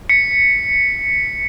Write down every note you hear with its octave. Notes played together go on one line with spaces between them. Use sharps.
B6 C#7